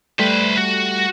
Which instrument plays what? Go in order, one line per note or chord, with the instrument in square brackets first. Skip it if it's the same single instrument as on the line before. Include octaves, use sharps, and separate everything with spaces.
[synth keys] G3 A3 [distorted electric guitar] B4 C5
[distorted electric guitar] F#4